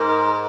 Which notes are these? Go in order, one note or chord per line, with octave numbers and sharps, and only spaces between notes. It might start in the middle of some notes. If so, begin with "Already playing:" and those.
Already playing: G#2 A#4